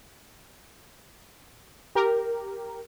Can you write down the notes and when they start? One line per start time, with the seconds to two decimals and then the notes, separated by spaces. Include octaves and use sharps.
1.95 G4 A#4